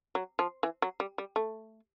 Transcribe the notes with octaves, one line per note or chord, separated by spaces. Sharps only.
F#3
F3
E3
F#3
G3
G3
A3